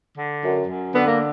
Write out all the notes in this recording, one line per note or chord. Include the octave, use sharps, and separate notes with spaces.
D3
F#2
F#2
D3 B3
A#3